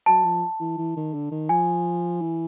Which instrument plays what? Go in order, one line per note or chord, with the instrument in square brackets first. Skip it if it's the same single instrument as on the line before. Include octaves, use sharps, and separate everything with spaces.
[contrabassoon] F#3 [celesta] A5
[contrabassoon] F3
E3
E3
D#3
D3
D#3
[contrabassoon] F3 [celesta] G#5
[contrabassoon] E3